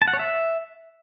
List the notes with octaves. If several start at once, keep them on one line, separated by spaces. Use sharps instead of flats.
A5
F#5
C#5
E5